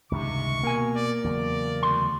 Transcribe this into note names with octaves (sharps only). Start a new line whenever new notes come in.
C#2 G2 C3 D#3 C#6
B2 A#3 A#4 G#5
D5
E2 C#3 F#3 D5
D2 C6